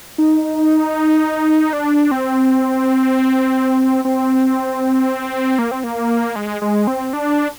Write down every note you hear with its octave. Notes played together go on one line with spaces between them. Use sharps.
D#4
D4
C4
C4
A#3
C4
A#3
G#3
G#3
C4
D4